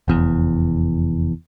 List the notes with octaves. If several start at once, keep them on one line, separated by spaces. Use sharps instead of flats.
F1 E2